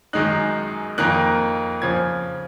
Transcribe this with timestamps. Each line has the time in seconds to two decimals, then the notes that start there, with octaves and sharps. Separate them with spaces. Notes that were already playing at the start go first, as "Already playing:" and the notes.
0.13 F#2 D#3 G#3 D#4 F#6
0.98 F2 D#3 A#3 D#4 F#6
1.82 C#3 F3 G#6